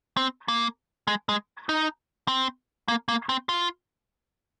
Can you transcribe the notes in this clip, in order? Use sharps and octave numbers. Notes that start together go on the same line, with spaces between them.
C4
A#3
G#3
G#3
D#4
C4
A#3
A#3
C4
F4